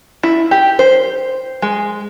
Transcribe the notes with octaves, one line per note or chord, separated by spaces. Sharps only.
E4
G4
C5
G#3